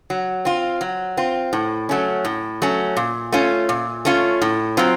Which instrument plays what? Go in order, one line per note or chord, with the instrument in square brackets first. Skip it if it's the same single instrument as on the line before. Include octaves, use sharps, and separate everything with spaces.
[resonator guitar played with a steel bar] F#3
C4 F4
F#3
C4 F4
A2
F#3 A3 C#4
A2
F#3 A3 C#4
A#2
A3 C#4 F4
A#2
A3 C#4 F4
A2
F#3 C4 F4